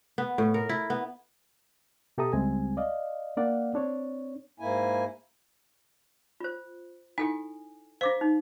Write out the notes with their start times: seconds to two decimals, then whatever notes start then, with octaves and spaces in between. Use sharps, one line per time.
0.18 B3
0.38 A2
0.54 A#4
0.69 E4
0.90 B3
2.18 B2 G4 A4 E5 A#5 D#6
2.33 C#2 G3 G#3 C4 G#5
2.77 D5 D#5 F5
3.37 A#3 D4 D5 F5 F#5
3.74 C4 D4 C#5
4.60 G#2 A#3 E4 G#5
6.40 F4 C5
7.18 D#4 E4 A4 G#5
8.01 D4 C5 F5 D6
8.21 D#4